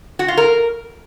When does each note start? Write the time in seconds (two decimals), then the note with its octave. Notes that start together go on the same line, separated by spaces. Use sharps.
0.19 F#4
0.28 F4
0.37 A#4